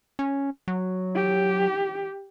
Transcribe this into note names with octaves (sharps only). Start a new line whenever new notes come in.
C#4
F#3
G4